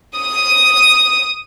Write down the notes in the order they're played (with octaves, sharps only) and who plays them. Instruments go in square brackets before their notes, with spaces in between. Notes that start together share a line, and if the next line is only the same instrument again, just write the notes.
[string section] D#6